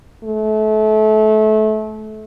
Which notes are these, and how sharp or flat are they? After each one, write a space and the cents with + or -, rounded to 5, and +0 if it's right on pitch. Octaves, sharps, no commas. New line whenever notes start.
A3 -30